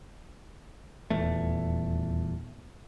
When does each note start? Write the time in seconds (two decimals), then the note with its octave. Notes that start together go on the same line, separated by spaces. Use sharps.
1.10 D#1 E2 A3